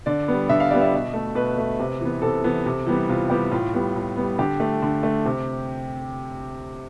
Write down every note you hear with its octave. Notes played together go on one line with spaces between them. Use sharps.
D3 D5
G3 B3
D3 E5
F5
G3 B3 D5
E5
B2
A3
B2 B4
A3
C3
E3 B3
C3 A4
E3 B3
C3
E3 G3 B3
C3 F4
E3 G3 B3 G4
A2 F4
G3 B3
A2
G3 B3
D3 G4
A3
D3
A3
C3